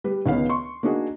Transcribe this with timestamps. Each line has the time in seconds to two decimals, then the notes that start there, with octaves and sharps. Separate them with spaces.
0.04 G3 B4
0.26 C#2 D#3 B3 C#5 F5
0.49 C6 C#6
0.83 A#3 D4 D#4 F#4 G#4